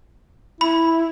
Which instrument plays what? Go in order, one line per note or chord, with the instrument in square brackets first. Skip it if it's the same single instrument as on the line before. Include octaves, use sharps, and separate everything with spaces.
[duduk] E4 [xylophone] B5